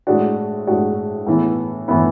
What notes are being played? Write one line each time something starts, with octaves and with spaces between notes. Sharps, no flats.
A2 G#3 D4 F#4
A2 G#3 D4 F#4
A2 E3 B3 E4
A2 E3 B3 E4